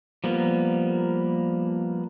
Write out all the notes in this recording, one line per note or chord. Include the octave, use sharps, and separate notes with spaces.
F3 G3 A#3 B3